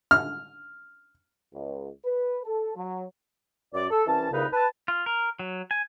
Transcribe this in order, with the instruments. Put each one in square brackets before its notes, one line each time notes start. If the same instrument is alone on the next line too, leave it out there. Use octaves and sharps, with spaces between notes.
[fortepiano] F6
[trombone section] C#2
B4
A4
F#3
[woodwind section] F#2 D5 D6
A4
C2 E3 C#4 A5
C2 A#2 C#3 D#4 B4
B4 A5
[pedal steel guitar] F4
A#4
F#3
G#5